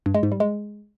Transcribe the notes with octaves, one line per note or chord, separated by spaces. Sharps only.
G2
G#3
G#2
G3
G#3